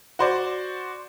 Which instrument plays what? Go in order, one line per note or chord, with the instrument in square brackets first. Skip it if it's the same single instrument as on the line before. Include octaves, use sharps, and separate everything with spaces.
[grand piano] F#4 C5 D5